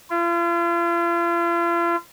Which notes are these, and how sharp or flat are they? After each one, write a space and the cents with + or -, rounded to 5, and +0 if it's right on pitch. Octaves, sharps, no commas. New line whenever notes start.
F4 -40